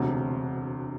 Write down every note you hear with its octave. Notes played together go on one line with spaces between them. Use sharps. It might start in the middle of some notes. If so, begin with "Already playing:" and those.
Already playing: E1 D2 C3